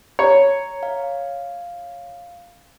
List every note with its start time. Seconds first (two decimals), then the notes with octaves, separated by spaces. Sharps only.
0.19 C#5 A#5
0.83 F5